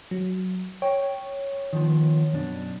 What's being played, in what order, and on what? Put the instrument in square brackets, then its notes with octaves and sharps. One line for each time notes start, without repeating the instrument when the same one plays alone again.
[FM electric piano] F#3
[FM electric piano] C#5 [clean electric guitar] G5
[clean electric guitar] D#3 F3 B3
F#2 B2 D4